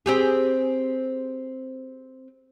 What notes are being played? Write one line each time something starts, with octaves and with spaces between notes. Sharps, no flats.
C4 G4 G#4